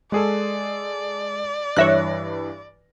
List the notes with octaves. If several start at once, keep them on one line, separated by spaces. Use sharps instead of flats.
G#3 G#4 A4 D5
G2 E3 C#5 E5 F#6 A#6